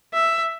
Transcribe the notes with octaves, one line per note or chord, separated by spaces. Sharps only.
E5